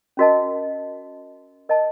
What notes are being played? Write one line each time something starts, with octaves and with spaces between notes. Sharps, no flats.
C#4 F#4 A#4 D#5 A5
A#4 D#5 A5